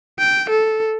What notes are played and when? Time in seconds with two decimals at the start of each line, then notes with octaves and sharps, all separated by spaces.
0.20 G5
0.50 A4